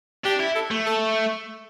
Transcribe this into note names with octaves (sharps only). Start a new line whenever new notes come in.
D4 G4
E4
A4
A3
A4